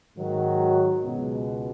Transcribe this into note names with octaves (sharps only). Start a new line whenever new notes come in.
G#2 D#3 F#3
C#2 B2 G#3 B3